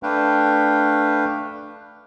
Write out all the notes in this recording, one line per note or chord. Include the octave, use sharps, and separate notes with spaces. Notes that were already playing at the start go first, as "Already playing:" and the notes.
A3 D4 B4 F5 G5